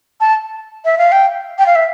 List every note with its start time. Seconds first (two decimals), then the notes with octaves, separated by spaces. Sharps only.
0.21 A5
0.85 E5
0.98 F5
1.12 G5
1.58 G5
1.66 F5
1.75 E5